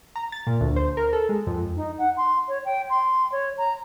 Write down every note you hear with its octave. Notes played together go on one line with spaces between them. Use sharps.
A#5
A6
A#2
D2
C5
A#4
A4
G#3
F2
D#4
F#5
C6
C#5
G5
C6
C#5
A#5